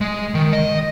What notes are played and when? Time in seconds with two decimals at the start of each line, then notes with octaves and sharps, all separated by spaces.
0.01 G#3
0.34 D#3
0.53 D#5